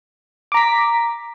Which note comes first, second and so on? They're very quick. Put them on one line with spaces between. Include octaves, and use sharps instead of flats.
D6 A#5 B6